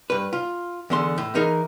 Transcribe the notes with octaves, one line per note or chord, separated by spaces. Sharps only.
G2 B4
F4
E2 D3 C6
A2
E3 D#4 G#4 A#4